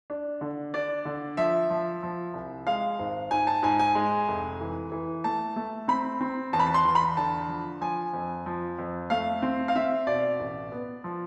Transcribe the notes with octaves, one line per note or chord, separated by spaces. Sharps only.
D4
D3
D4 D5
D3
F3 E5
F3
F3
C2
G#3 F5
G#1
G#2 G#5
A5
G#2 G#5
G#5
G#3
F1
E3
E3
A3 A5
A3
C4 B5
C4
E2 A5
B5
A5
C6
E2
B5
D3 A5
F3
F3 G#5
F2
F3
F2
A3 F5
C4
F5
C4 E5
B2 D5
A1
B3
F3